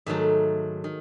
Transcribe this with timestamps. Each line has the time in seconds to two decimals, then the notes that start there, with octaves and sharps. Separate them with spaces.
0.06 G#2 D#3 F#3 A3 E5
0.84 D#3